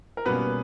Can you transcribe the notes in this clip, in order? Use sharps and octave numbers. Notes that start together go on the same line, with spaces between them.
A#4
B2 G3 A#3 B3 C#4 B4